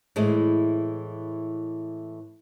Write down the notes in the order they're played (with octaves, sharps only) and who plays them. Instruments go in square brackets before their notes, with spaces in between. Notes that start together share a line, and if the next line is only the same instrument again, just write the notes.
[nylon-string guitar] A2 E3 G#3 C4